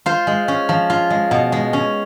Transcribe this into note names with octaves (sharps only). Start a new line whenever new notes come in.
F4 C5
G#3
C#4
F3
F4
G#3
B2
G#3
C#4